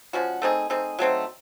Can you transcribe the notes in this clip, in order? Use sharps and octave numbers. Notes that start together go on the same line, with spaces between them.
F3 G#3 C#4 F#4
A3 C4 D#4 G#4
A3 C4 D#4 G#4
F#3 A3 C4 D#4